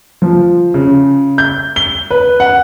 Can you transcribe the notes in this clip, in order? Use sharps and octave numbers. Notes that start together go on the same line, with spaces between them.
F3
C#3
G6
G7
B4
F#5